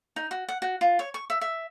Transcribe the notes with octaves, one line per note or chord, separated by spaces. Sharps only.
D#4
F#4
F#5
F#4
F4
C#5
C#6
E5
E5